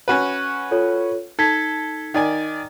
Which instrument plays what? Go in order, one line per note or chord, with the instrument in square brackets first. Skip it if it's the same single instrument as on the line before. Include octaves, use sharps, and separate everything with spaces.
[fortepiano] C#4 F#4 B4
[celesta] F4 A4 C#5
[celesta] D#4 G#6 B6 [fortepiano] A4
[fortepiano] D#3 D5 G#5